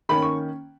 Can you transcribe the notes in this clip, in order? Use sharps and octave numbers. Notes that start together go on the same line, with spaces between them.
D#3 A#3 C#4 B5
C#6